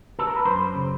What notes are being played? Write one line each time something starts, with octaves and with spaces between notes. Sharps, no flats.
A4
A#4
B4
F#2 C5
C#3